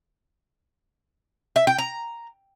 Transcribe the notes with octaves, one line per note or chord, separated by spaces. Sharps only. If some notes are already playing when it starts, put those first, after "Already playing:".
E5
G5
A#5